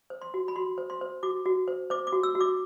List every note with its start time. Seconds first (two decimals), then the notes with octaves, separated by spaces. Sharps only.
0.10 C5
0.22 C6
0.34 F#4
0.48 B5
0.56 F#4 C6
0.78 C5
0.90 C6
1.01 C5
1.23 F#4 D6
1.46 F#4
1.68 C5
1.90 C5 D6
2.07 D6
2.13 F#4
2.23 E6
2.35 F#4
2.41 D6